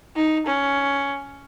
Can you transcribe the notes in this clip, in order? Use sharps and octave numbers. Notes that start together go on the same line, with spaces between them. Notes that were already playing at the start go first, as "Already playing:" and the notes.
D#4
C#4